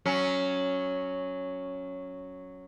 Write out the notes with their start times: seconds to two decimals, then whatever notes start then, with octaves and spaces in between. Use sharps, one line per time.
0.05 F#3 C#4